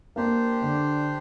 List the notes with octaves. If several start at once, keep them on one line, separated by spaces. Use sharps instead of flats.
A#3 D4 G4 C5
D3